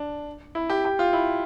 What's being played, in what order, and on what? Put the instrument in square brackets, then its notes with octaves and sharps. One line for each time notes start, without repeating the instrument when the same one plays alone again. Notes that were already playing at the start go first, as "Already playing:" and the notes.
Already playing: [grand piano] D4
E4
G4
G4
F4
E4